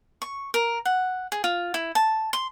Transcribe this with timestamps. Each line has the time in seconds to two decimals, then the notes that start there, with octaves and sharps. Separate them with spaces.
0.22 C#6
0.54 A#4
0.85 F#5
1.32 G#4
1.44 F4
1.74 E4
1.95 A5
2.33 C6